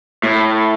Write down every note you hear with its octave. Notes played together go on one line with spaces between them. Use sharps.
A2